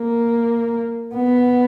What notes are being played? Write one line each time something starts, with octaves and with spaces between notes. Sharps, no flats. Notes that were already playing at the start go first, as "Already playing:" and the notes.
Already playing: A#3
B3